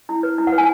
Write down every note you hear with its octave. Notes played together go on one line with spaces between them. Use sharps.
E4
B4
E4
F#5
B4
G#5